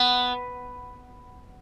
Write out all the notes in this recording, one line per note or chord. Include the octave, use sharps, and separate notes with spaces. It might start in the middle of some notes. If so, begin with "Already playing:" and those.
Already playing: B3